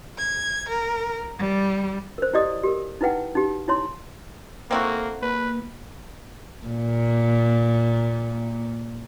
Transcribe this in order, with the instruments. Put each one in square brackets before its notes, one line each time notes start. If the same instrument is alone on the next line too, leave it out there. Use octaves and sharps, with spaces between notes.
[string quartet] G#6
A#4
G3
[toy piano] A#4 C5
E4 G4 D5 D#5 D#6
G4 A4 A#4
D#4 E4 B4 F#5 G5
D#4 G4
D#4 E4 C#5 C6
[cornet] A#3 [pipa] C4 E4 F#4 [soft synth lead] A4
[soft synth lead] A#3 [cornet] B4
[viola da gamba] A#2 A#3